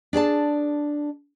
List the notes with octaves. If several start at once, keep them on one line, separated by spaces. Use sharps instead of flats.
D4 G#4 D5 A5